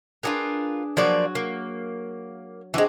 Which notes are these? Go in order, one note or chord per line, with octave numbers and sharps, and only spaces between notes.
D4 F4 F#4 G#4 A#4 B4
F3 F#3 A#3 F#4 D5
A#3
E3 G#3 C4 D4 F#4